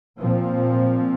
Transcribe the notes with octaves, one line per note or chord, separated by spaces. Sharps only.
A#2 F3 C4